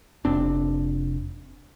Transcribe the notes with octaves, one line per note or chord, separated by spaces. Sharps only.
F1 C4 D4